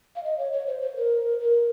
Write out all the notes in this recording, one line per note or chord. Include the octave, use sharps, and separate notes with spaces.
F5
D#5
C#5
C#5
C5
C5
A#4
A#4